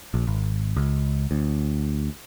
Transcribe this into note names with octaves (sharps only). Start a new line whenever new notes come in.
A#1
G#1
C#2
D2